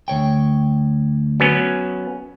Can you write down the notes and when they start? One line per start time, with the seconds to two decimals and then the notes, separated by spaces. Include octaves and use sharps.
0.08 D2 C#5 G5
1.40 F#3 B3 C#4